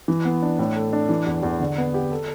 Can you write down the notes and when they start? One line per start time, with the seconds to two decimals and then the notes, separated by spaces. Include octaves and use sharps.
0.08 E3
0.25 B3
0.42 D4
0.59 A2
0.76 A4
0.93 D4
1.09 E3
1.27 E2
1.43 E2
1.60 D3
1.78 B3
1.94 G4
2.12 A4